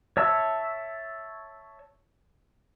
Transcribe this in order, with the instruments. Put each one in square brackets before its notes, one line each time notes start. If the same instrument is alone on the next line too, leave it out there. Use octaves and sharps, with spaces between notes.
[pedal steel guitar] C#5 E5 A5 E6